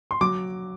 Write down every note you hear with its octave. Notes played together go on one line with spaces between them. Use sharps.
C6
F#3 D6